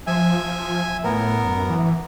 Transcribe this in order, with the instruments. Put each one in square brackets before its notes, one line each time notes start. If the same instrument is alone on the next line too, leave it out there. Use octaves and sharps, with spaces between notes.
[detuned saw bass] F3 [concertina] E5 G#5
[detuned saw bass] A2 [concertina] B3 A#4
[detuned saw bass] F#2
E3